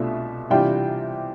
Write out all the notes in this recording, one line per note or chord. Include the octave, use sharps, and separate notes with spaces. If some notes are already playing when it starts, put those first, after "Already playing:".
Already playing: C2 B2 A3 D4 F4 E5
C3 E3 G3 D4 F4 G5